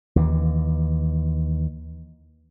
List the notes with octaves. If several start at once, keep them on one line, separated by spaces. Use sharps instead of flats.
D#2 E3